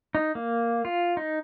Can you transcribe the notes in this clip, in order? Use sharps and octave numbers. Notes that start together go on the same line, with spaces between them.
D#4
A#3
F4
D#4